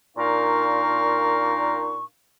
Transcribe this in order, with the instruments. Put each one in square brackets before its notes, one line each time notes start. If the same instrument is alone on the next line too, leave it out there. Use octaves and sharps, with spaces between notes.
[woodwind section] A#2 D4 D#4 A#4 F5 C#6